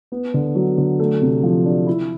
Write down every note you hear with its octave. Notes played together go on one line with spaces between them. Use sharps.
B3
D3
F#3
D3
A3
C3
F3
D4
E4